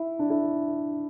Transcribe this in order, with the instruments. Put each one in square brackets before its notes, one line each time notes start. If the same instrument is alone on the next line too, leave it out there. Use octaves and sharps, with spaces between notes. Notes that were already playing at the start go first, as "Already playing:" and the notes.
Already playing: [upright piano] E4
D4
E4